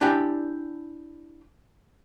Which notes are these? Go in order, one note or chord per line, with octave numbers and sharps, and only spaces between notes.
D4 E4 G4 D5 G5 G#5